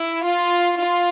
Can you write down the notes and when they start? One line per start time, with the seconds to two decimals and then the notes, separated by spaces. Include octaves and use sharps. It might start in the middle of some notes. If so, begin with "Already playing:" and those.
Already playing: E4
0.24 F4
0.78 F4